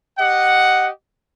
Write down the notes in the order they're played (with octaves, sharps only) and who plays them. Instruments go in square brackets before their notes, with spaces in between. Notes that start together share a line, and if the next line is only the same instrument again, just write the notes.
[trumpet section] G4 D#5 F#5